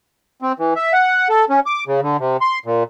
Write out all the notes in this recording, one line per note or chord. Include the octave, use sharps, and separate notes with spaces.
C4
E3
E5
F#5
A4
C#4
D6
C#3
D3
C3
C6
A#2